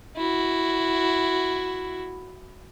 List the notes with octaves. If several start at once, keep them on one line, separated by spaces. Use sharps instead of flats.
E4 F#4